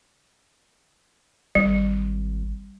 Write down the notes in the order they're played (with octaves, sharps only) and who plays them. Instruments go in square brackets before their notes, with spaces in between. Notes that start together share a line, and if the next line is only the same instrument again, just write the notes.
[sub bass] G#1 [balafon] G3